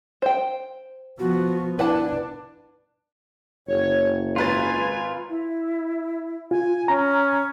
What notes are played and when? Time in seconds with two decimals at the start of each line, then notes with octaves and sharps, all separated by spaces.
0.22 C5 G5
1.19 F3 B3 F#4
1.79 D4 E4 B4 F#5 A5
3.68 F#1 C#5
4.36 G#1 F4 B4 G#5 A6
5.29 E4
6.51 F4 G#5
6.88 C#4 A#5